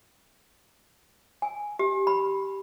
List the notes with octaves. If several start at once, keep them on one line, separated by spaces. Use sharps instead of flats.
G#5
G4
B5